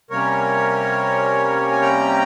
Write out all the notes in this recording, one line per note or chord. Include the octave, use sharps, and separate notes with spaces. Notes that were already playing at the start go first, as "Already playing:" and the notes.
C3 G3 A#3 C#4 A#4 C#5
G#5
G5 A#5